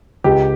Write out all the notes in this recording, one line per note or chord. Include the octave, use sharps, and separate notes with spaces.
C#2 G4